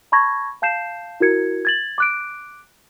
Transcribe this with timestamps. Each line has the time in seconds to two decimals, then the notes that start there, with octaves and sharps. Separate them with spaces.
0.12 A5 B5 C#6 G#6 A#6
0.62 F5 A5 G6 C7 E7
1.20 E4 F#4 A#4 G#6 C#7
1.65 G#6 A6 F#7
1.98 D6 F#6 D7